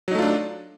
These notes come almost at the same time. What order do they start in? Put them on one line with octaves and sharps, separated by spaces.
F#3 D#4 A3 F4 D4